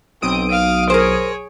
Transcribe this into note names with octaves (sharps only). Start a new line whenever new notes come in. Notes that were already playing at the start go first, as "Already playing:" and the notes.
B1 C4 D#6 D7
F5
G#4 A#4 C5 C#5